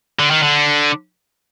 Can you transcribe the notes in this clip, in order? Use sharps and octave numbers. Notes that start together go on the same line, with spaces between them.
D3
D#3
D3